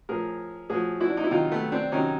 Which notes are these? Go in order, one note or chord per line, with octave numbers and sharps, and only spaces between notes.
A2 F3 G#4 A#4
A2 F3 F#4 G#4
E4 F#4
D4
D#4
E4
C3 D#3 F#3 D#4 F4
A3 B3
C4 D4
C3 D#3 F#3 C#4 D#4